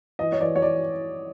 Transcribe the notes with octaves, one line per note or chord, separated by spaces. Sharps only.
E3 D#5
C#5
E3 D5
C#5
E3 D5